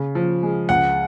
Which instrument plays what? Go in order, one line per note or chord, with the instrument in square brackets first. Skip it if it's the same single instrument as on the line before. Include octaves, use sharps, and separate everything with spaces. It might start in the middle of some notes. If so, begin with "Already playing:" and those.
Already playing: [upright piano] C#3
F3
G#3
[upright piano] C#2 [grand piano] F#5